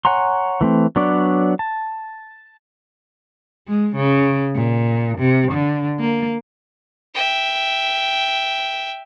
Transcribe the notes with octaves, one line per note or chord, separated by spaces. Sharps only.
C#5 F#5 G#5 A#5 C6
E3 A3 C4
F#3 B3 D4 C#5 D5
A5
G#3
C#3
A#2
C3
D3
A#3
E5 G5